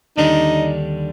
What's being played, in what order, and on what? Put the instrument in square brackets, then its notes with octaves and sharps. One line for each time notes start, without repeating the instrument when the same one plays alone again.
[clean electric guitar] D#2 D3 G3 D4 [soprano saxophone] D#4